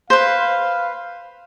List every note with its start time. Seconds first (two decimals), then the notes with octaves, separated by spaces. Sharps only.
0.10 B4 C5 F5